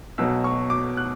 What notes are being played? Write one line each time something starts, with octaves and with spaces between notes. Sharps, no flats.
B1 B2 F#3 E6
C#6
D6
F#6